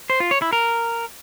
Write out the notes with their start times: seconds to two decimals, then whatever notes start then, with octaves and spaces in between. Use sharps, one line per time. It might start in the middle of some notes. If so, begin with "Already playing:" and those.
0.10 C5
0.20 F4
0.31 C#5
0.42 E4
0.53 A#4